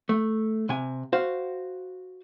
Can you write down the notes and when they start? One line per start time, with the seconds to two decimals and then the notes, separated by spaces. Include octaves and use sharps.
0.09 A3
0.69 C3 G#5
1.13 F#4 C5 F5